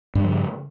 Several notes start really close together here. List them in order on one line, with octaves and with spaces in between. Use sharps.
G2 G3 F3 C#3